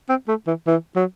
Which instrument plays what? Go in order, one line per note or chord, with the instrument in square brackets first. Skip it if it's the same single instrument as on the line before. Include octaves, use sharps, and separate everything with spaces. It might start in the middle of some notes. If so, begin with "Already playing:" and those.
[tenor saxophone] C4
A3
E3
E3
F#3